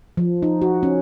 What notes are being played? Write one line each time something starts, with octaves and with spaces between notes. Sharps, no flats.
F3
D#4
F#4
C#4